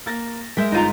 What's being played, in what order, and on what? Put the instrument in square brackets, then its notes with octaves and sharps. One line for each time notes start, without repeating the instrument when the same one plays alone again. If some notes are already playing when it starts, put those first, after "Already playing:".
[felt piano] A#3 A6 A#6
[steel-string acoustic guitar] G#3 A#4 [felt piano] E5 G6 B6
[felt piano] G1 D#7 [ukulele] D#4 F4 A#5